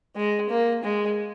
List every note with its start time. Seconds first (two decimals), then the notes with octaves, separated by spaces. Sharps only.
0.16 G#3
0.49 A#3
0.83 G#3